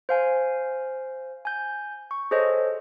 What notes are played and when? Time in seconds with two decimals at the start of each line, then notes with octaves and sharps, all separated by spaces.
0.09 C5 F5 G#5
1.45 G#5 G6
2.11 C#6
2.31 G#4 A4 C5 C#5 D#5